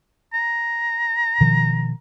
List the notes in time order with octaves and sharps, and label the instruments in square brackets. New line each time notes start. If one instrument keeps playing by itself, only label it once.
[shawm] A#5
[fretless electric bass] B2 D#3 F3